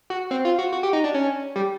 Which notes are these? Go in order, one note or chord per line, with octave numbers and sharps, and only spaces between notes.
F#4
C4
F4
F#4
F#4
G4
D#4
D4
C#4
G3